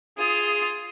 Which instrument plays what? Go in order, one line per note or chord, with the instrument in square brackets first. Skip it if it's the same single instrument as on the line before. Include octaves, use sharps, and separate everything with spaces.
[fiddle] F4 D#6 [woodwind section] G#4